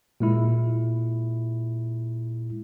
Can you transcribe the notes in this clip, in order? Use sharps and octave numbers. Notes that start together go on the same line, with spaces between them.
A#2 G#3 E4